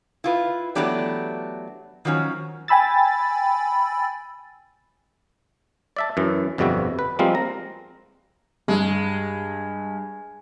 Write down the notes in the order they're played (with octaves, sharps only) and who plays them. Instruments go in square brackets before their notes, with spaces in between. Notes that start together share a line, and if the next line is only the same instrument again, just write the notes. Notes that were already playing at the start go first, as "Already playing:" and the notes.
[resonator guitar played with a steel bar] E4 F4 B4
E3 F#3 A3 B3 D4 G4
D#3 F3 F#3 C#4
[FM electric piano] G5 G#5 B5 E6 A6
[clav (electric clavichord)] D5 E5 A5
F#2 E3
G1 F2 B2 G3 F#4 E5
B4
F3 G3 G#3 A#3 C4 F4
A#5
[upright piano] G2 [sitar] G#3